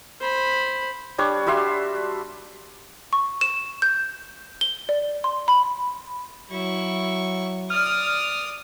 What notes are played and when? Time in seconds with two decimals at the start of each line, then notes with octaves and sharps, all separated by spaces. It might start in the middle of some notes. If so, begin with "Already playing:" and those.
0.20 C5 B5
1.18 G3 D4 C#5
1.46 G3 F#4 E5 C6
3.13 C#6
3.41 E7
3.82 G6
4.61 G7
4.89 D5
5.24 C6
5.48 B5
6.51 F#3 E4 C#6
7.70 D5 D#6 F6